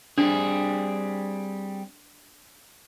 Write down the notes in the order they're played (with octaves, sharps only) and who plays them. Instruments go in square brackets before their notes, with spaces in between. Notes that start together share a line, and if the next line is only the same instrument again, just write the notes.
[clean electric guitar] G3 C4 G#4 [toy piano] D4